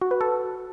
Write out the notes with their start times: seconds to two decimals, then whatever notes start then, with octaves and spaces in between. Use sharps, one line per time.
0.01 F#4
0.11 B4
0.21 A4